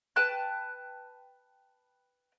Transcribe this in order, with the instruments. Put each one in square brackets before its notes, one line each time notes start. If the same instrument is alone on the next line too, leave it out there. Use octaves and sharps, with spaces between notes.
[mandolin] B4 G5 A5 F#6